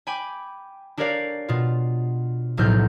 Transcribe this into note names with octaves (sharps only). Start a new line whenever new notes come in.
G5 G#5 B5 D6
D4 G4 A#4 C#5 D5 F5
B2 F4
F1 B1 A2 F6 G6